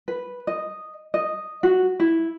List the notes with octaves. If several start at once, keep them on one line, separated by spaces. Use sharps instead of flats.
B4
D#5
D#5
F#4
E4